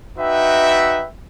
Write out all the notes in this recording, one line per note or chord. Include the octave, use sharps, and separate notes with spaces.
D#4 F#4 B4 E5 G5